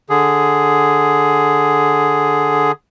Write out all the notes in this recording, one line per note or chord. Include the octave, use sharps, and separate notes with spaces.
D3 G#4